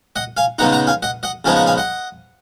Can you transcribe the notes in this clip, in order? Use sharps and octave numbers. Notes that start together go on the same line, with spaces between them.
D#5 F#5
F5 G#5
C#3 G#3 B3 D#4 F#5 A#5
F#5 A#5
F5 G#5
D#5 F#5
D#5 F#5
C#3 F3 G#3 B3 D#4 F5 G#5
F#5 A#5
F5 G#5
D#5 F#5